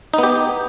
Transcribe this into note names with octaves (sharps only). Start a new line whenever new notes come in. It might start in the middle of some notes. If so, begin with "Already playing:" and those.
B3 D#4 G4